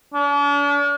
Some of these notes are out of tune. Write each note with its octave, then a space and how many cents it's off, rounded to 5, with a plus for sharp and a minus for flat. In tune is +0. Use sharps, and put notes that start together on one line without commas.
D4 -45